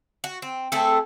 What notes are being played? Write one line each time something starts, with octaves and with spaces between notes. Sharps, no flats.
F#4
C4
A3 C4 G#4 A4